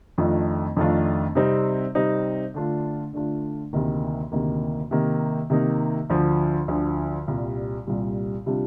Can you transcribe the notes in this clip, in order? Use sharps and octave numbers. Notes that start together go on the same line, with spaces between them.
F2 D#3 A3 D4 F4
F2 D#3 A3 D4 F4
C3 G3 C4 D#4
C3 G3 C4 D#4
D3 A3 D4 F4
D3 A3 D4 F4
D2 C3 D#3 A#3
D2 C3 D#3 A#3
C3 D#3 A#3 D#4
C3 D#3 A#3 D#4
D2 D3 F3
D2 D3 F3
C2 A#2 G3
C2 A#2 G3
C3 G3 D4 F4